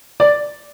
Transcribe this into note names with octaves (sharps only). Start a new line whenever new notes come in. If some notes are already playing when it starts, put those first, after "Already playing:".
D5